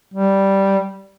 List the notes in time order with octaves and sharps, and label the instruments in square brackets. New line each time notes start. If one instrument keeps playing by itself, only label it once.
[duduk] G3